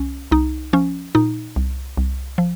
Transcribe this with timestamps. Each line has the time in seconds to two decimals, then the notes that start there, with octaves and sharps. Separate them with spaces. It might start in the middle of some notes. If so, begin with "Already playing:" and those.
Already playing: C2 C#4
0.31 C2 D#4
0.73 F3 C#4
1.15 A#2 D#4
1.56 C2
1.97 C2
2.38 F3